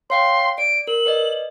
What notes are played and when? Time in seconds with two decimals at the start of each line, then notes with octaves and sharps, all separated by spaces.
0.10 C#5 F5 G5 C6
0.58 D5 D7
0.88 A#4 F#7
1.06 B4 D5 D#5